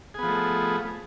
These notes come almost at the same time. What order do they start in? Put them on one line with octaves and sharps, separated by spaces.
G#4 B3 F3 A3